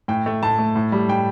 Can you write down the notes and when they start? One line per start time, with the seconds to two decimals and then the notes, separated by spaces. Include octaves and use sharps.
0.08 A2 G5
0.26 A3
0.43 A2 A5
0.59 A3
0.76 A2
0.92 G3
1.08 A2 G5